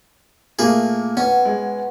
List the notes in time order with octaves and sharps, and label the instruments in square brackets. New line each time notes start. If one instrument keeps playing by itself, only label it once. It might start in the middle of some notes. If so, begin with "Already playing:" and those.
[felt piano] A#2 A3 [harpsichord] A#3 G#4
[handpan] B3 [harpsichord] C#4
[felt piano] G#3